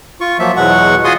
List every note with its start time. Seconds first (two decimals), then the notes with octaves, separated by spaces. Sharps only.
0.21 F4 C#6
0.39 F3 F#3 A#3 E5
0.57 E2 B2 F#3 G#3 F#5 C#6
1.04 F4 F#4 G#4 G#5 C6 D#6